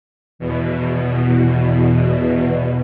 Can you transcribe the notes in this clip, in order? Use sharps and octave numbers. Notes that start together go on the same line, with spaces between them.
E2 B2